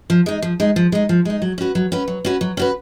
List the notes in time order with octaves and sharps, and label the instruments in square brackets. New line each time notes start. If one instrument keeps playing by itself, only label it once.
[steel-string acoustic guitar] F3
G#3 D#4
F3
G#3 D#4
F3
G#3 D#4
F3
G#3 D#4
F#3
C#4 F#4 B4
F#3
C#4 F#4 B4
F#3
C#4 F#4 B4
F#3
C#4 F#4 B4